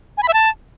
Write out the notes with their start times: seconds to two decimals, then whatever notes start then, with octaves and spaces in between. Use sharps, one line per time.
0.17 G#5
0.23 B5
0.28 E5
0.33 A5